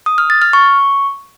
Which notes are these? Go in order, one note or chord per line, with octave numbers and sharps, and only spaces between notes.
D#6
F6
A6
F6
C#6